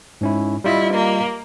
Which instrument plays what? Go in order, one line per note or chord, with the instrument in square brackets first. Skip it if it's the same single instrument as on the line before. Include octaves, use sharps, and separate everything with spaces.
[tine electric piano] G#2 C#4 E4
[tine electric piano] G3 F4 D#5 [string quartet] E4
[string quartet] A#3